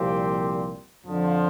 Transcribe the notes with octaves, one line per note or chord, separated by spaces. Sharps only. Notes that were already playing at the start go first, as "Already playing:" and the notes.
Already playing: C2 A#2 F3 C4 G4
F2 D3 F3